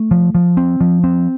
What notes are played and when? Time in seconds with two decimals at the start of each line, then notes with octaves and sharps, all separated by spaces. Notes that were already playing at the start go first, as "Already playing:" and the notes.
Already playing: A3
0.11 F3
0.35 F3
0.57 C4
0.81 F3
1.04 C4